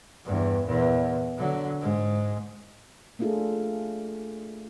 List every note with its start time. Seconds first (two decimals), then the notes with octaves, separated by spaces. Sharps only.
0.25 E2 G2
0.66 E2 A#2
1.38 D3 F#3
1.81 G#2 G#3
3.19 A3 A#3 D4 F4 G#4 A4